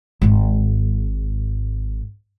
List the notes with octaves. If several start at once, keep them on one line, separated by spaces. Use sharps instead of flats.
G#1 G#2